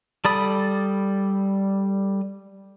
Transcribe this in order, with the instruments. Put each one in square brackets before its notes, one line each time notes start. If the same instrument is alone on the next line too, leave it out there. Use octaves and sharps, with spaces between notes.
[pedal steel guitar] G3 A4 D5 B5 D#6